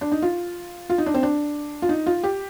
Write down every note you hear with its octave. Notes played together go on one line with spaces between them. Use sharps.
D4
D#4
F4
F4
D#4
D4
C4
D4
F4
D#4
F4
G4